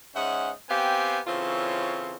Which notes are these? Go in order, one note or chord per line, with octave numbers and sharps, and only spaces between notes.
G#2 C#4 D#5 E5 F#5
B3 C4 G4 F5 G5 G#5
C#3 E3 C4 F4 A4 C#5